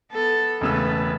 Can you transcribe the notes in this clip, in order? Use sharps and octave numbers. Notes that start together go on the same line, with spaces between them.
B3 A4
E1 C#3 A3 B4 E6